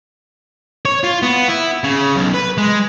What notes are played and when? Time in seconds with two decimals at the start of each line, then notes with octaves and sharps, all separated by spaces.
0.85 C#5
1.04 F4
1.23 B3
1.49 E4
1.84 C#3
2.16 B1
2.34 B4
2.58 G#3